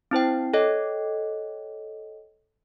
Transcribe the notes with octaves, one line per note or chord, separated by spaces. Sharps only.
C4 E4 C5 G5
A4 C#5 D#5 G5